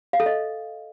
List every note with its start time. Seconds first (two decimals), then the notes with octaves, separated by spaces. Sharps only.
0.13 F5
0.20 A4
0.26 D#5